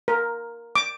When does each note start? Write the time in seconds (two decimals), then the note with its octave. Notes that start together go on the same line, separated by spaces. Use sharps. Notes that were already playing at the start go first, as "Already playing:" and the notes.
0.08 A#4
0.75 D6